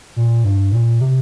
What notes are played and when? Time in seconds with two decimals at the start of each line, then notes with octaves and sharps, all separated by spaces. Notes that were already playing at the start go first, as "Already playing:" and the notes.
0.16 A#2
0.44 G2
0.72 A#2
1.01 C3